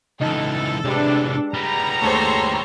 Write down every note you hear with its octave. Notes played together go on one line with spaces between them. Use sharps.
C#2 E3 D#4 A4
A2 C3 G#3 D4 G4 B4
G3 B3 A#5
D#2 G#3 A3 A4 C5 C#5